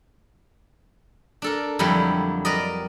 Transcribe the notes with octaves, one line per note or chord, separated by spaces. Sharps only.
D4 A4 A#4
F2 D3 F#3 G3 E4
A#4 B4 D5 D#5